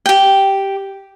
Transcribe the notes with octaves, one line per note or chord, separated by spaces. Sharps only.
G4 G5